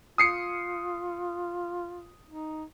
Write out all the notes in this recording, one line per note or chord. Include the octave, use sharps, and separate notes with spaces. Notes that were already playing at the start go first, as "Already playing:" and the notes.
F4 D#6 C7 C#7
D#4